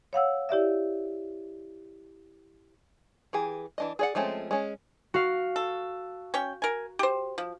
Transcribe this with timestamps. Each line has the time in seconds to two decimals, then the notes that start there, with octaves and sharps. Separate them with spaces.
0.13 C#5 F5 F#5 E6
0.49 E4 G4 D5 E5
3.33 E3 G4 G#4
3.78 E3 D4 D#5
3.99 G#4 D5 F#5
4.15 F3 G#3 A3 C4 C#4
4.51 G#3 C#4
5.14 F#4 F5
5.56 A4
6.34 C#4 C#5 G5
6.62 A#4 G#5
6.99 G4 C5
7.38 F3